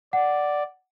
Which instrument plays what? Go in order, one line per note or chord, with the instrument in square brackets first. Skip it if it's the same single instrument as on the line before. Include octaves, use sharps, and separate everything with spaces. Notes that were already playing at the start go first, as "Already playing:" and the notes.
[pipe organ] D5 [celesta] F#5